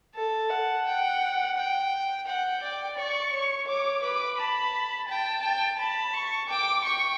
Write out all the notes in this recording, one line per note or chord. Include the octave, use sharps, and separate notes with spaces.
A4 A5
F#5
G5
G5
F#5 G5
D5
D5 C#6
C#5
C#5 D6
B4 D6
A5 B5
G5 A5
G5
A5 B5
C#6
G5 D6
G5 C#6